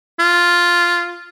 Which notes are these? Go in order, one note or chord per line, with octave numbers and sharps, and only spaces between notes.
F4